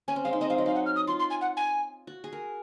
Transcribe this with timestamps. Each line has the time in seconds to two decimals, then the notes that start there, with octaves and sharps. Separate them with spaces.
0.08 C#4 G#5
0.16 C4
0.24 G#3 F5
0.33 D#4
0.41 C4 D#5
0.49 G#3 F5
0.58 F#3 D#5
0.66 D#4 F5
0.75 F#5
0.86 F6
0.96 D#6
1.07 F4 C6
1.19 C6
1.30 G#5
1.41 F#5
1.57 G#5
2.07 F#4
2.24 G#4
2.33 A#4